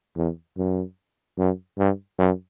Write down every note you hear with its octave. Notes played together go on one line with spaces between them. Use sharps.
E2
F#2
F#2
G2
F#2